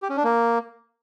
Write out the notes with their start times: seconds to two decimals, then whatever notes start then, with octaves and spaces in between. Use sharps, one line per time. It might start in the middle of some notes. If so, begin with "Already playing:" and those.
0.02 G4
0.09 C#4
0.17 D4
0.24 A#3